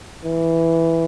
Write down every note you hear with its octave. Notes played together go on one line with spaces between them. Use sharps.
E3